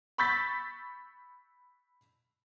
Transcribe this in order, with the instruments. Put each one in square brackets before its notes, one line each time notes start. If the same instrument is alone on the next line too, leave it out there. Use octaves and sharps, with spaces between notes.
[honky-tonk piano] B5 C#6 E6 G6 A6 B6